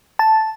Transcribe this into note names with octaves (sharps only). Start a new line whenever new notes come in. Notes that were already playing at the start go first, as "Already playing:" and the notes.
A5